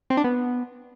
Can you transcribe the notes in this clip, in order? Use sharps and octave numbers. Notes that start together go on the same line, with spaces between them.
C4
D4
B3